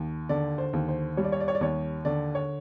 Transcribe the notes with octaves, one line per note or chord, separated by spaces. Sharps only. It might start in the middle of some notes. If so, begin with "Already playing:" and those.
Already playing: D#2
D3 D5
C5
D#2
C5
G3 C#5
D5
C#5
D5
C#5
D5
D#2 C#5
D3 D5
C#5